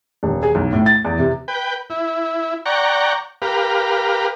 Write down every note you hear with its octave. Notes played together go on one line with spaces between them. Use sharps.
D#1
G#4
B1
A2
A6
E2
C3
B4 G5
E4
D5 F#5 G5 A#5 C#6
G4 A#4 B4 F5